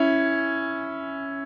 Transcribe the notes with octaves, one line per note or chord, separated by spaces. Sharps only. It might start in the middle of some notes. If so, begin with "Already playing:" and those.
Already playing: C#4 E4